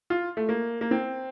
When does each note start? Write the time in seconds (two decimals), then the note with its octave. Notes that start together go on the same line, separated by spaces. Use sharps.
0.10 F4
0.37 A3
0.49 A#3
0.81 A#3
0.91 C4